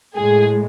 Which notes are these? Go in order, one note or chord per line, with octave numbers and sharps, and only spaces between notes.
A2 G#3 G#4